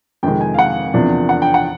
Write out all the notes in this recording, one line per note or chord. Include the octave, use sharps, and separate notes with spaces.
F2 C3 D#3 G#3 G5
G#5
F5
F#5
E2 C3 F3 A#3 D4
F#5
G5
F#5